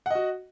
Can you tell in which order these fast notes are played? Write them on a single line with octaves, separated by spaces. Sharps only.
F#5 D#5 F#4